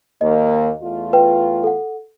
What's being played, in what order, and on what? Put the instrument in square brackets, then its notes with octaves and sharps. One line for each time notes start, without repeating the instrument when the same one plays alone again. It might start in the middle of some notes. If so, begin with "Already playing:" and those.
[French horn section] D#2 A#3 [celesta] D#5
[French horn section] E2 A3 F4
[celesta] B4 G5
A4 F#5